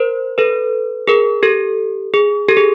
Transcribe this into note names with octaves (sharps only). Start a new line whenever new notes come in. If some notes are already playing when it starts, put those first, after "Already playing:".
Already playing: A#4 C5
A4 B4
G#4 A#4
G4 A4
G#4
G4 A4
G#4